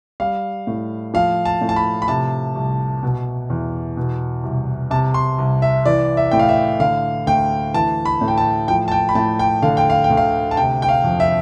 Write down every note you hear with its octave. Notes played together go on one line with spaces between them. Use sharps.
G3 F5
A2
F3 F5
A5
A2
A5
B5
B5
C3 A5
C2
B2
E2
B2
C2
C3 A5
C6
C2
E5
E3 D5
E5
A2 G5
F5
E5
D3 F5
D2 G5
E3 A5
B5
A2
G5
A5
F3 G5
A5
G5
B5
A2 A5
G5
D3 F5
G5
F5
G5
D2
F5
A5
C3 G5
G5
F5
F2
E5